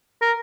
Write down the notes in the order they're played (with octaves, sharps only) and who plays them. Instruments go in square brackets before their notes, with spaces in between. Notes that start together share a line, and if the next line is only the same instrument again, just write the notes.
[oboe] A#4